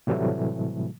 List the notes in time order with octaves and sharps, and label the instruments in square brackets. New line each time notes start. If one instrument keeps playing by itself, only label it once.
[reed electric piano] A2 C3 E3 F#3 G3 A3